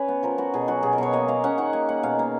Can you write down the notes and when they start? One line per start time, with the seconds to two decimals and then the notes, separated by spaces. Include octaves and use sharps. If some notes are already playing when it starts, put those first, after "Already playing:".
Already playing: C#4 B4 C#5
0.08 B3
0.23 F3 A#4
0.38 B3 F#4
0.54 B2 G#4
0.68 F#3 F#4
0.83 B2 G#4
0.93 A#4
0.98 B2 C#5
1.13 A#3 D#5
1.28 A#3 F5
1.44 C#4 F#5
1.58 D#3 F#5
1.73 A#3 G#5
1.89 A#3 F#5
2.03 B2 F5
2.19 A#3